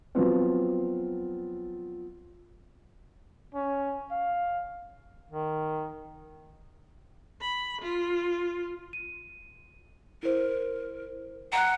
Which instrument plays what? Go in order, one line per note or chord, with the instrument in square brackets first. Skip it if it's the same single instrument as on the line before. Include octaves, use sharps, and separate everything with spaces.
[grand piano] F3 F#3 B3 C4
[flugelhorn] C#4
F5
[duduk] D#3
[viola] B5
F4
[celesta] D#7
[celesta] E4 C5 [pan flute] A#4
[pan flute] F#5 [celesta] A#5 F#6